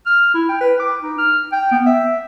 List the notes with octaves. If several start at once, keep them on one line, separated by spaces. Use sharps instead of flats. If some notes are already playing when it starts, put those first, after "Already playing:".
F6
E4
G5
B4
D6
D#4
F6
G5
B3
E5